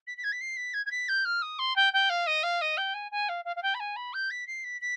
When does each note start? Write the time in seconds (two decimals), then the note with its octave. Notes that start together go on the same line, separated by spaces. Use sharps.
0.07 B6
0.17 B6
0.23 G#6
0.32 B6
0.40 C7
0.56 B6
0.73 G#6
0.85 G#6
0.91 B6
1.08 G6
1.25 F6
1.42 D#6
1.58 C6
1.76 G5
1.93 G5
2.09 F5
2.26 D#5
2.43 F5
2.61 D#5
2.77 G5
2.94 G#5
3.11 G#5
3.28 F5
3.44 F5
3.56 F5
3.62 G5
3.74 B5
3.79 G#5
3.96 B5
4.13 G6
4.30 B6
4.47 C7
4.64 B6
4.81 B6